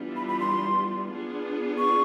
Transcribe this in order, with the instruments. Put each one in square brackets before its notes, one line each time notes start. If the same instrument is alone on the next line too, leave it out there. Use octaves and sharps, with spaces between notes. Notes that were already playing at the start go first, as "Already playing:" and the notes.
Already playing: [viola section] E3 G3 B3 D4 F4
[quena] B5
B5
C6
[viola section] B3 D4 F4 G#4
[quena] C#6